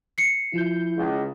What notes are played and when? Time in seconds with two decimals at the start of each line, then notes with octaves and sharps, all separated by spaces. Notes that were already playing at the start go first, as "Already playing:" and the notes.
0.18 C7 C#7
0.54 F3 E4 G6
0.96 C#2